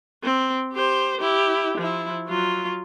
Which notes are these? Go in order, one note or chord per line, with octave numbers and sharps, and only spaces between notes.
C4
G4 C5
E4 G4
F3 E4
F#3 F4